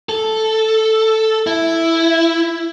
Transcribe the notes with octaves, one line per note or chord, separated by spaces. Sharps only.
A4
E4